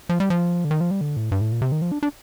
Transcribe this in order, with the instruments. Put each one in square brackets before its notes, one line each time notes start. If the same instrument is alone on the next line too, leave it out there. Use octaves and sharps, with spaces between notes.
[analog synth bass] F3
G3
F3
D3
D#3
F3
G3
D3
A2
G2
A2
A#2
C3
D#3
F3
D4
D4